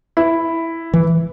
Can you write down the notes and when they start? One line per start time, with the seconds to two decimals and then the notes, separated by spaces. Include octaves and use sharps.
0.17 E4
0.94 E3